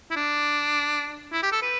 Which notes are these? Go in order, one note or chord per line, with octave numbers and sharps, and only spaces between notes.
E4
D4
E4
G4
A4
B4